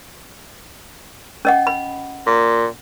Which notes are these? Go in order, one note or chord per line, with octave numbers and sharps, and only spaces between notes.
C#4 D#5 F#5
B5
A#2